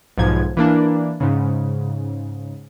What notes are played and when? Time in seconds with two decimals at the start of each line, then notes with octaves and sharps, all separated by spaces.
0.18 B1 G#2 F3 G#6
0.57 E3 A#3 D4
1.20 G#2 C#3